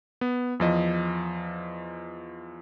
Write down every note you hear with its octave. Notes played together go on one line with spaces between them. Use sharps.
B3
E2 F3 D#5